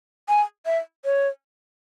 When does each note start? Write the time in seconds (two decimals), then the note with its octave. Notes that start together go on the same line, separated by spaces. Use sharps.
0.29 G#5
0.66 E5
1.05 C#5